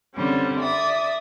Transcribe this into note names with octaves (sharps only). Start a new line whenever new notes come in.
D3 G3 C4 C#4
D5 E5 D#6